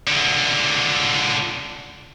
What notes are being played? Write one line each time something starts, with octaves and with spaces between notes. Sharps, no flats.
C#2 D3